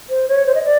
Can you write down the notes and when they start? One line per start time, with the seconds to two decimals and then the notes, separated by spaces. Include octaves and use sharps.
0.10 C5
0.28 C#5
0.46 C5
0.55 D#5
0.64 D5